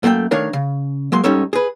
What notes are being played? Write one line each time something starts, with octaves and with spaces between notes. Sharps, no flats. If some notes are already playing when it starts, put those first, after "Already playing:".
F#2 A3 A#3 G4 G5
D#3 A3 D4 A#4 C#5 F5
C#3
F#3 G#3 A#3 C6
G#2 G3 C#4 D#4 A4 C#5
G#4 B4